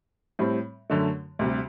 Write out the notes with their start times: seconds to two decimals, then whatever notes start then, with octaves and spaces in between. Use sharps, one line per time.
0.39 A2 G3 C4
0.90 F#2 D3 A3
1.39 D2 C3 G3